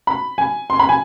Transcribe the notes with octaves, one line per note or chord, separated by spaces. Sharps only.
B5
G#5
C6
B5
G#5